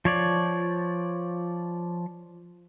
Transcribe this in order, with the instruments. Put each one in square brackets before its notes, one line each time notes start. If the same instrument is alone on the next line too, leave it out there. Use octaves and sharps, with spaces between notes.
[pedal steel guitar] F3 C#5 D5